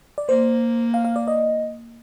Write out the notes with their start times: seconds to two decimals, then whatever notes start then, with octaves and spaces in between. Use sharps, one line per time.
0.18 D5
0.29 A#3 C5
0.94 F5
1.05 F5
1.16 D5
1.28 D#5